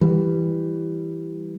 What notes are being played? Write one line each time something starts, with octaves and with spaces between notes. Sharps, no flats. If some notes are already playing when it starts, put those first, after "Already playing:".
E3 G3